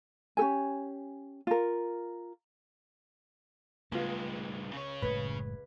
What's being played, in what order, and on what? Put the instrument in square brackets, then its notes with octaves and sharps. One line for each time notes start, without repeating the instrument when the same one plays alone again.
[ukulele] C#4 G4 A4 G#5
F4 A#4
[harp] C#2 G#4 [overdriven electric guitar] G2 G#3 [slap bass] A3 [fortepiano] B3 F4
[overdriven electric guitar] C#3 C#5
[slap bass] F#1 A2 G#3 [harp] B4 G#6